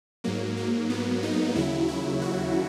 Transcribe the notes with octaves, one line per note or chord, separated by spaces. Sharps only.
G#2 F#3 A#3
A#3
B3
D#4
D#2 C#3 F#3 E4
E4
F#4